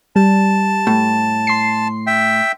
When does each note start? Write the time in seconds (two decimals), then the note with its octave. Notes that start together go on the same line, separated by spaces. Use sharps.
0.16 G3 A5
0.87 A2
1.47 C6 C7
2.07 E5 G5